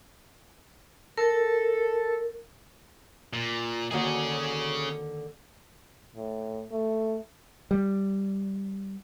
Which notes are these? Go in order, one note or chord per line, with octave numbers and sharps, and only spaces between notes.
A4 A#4
A#2
D#2 D3 C#4 F#4 G#4
A2
A3
G3